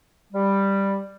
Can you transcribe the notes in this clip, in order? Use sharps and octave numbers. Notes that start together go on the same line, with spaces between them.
G3